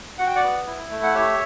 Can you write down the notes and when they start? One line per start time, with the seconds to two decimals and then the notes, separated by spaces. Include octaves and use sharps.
0.18 F#4 F#5
0.27 G5
0.36 D5 F#5
0.43 B3
0.67 E4
0.90 A3
1.03 F#5
1.14 G4 C#5 E5